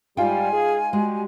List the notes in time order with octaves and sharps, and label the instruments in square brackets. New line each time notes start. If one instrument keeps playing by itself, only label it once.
[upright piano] G#2 F4 [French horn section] G3 [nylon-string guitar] G5 [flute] G#5
[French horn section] G#4
[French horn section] G3 F#4 G4 [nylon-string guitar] G#3